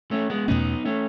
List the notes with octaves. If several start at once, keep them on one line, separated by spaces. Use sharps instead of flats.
A3 C#4
G#3 B3
E2 B2 A3 B3 C#4 D#4
A3 C#4